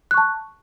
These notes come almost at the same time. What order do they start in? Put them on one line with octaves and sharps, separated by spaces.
F#6 C#6 A5